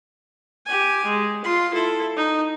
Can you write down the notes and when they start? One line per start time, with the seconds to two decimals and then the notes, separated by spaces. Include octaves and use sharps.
0.66 G4 G#5
1.06 G#3
1.44 F4 C6
1.74 E4 A4
2.17 D#4